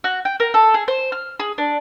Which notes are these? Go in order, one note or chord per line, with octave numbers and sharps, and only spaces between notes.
F#4
G5
A#4
A4
G#4
C5
F6
G#4
D4